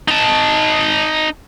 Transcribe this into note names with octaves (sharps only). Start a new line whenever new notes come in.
D#4 A5